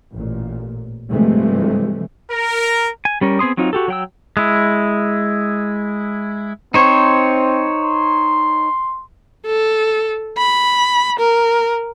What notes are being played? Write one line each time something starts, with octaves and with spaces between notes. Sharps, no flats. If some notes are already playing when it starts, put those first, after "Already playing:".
A1 A#2
G2 C3 E3 F3 G#3 A3
A#4
G#5
G3 C#4 A#4
B3 C4 G#4 C6 D#6
F#3 C4 D#4 F4
F#4 G4 A4
F#3 G5 E6
G#3 E4
C4 D#4 C5 C#5
C6
A4
B5
A#4